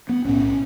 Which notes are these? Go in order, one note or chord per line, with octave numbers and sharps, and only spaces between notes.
B3
B1 A2 C#4